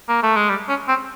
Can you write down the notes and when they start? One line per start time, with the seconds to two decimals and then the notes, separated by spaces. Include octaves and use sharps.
0.09 A#3
0.23 A3
0.36 G#3
0.50 G3
0.69 C#4
0.88 C4